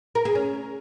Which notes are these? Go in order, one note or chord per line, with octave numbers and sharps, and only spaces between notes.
A#4
G#4
C#4